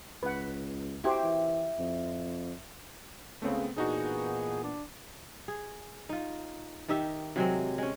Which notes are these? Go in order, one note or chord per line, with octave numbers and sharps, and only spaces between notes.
C#2 B4 F#5
E4 F#4 G4 C5
E3
F2
C#2 C#3 A3 B3 C4
A#2 E3 B3 D4 D#4 F#4 G#4
D4
G#4
D#4 F4
D#3 D#4 G4 E5
C3 F#3 G#3 C4
G#3 C#4